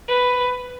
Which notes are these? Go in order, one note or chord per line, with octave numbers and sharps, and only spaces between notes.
B4